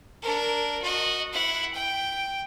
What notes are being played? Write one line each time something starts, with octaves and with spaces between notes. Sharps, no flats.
D4 A#4
F#4 D#5
E4 F#5
G5